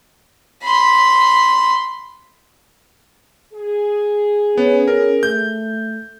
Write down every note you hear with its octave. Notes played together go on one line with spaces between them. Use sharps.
B5 C6
G#4
B3 C#4
C#4 A#4
A3 G6